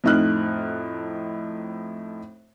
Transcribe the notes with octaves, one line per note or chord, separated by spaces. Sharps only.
F2 A2 D#4 F6 F#6